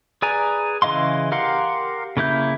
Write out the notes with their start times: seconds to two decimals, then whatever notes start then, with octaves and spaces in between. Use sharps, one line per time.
0.22 G#4 B4 D5 G#5 A#5
0.82 C#3 E3 D#5 F5 C6
1.32 G4 A#4 F5 F#5 C6
2.17 C#3 A#3 E4 G6